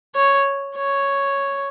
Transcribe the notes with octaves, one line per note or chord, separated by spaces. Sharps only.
C#5
C#5